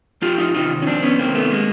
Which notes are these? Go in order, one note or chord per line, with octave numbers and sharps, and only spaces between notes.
F2 F4 G4
D#4 F4
C3 D#3 D#4 F4
C#4
F2 C4 D4
B3 C#4
C3 D#3 A#3 C4
A3 B3
G#3 A#3